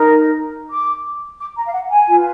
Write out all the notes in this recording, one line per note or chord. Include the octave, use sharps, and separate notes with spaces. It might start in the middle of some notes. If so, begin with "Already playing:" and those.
Already playing: D#4 A#4
D6
D6
A#5
F5
F#5
G#5
F4 B4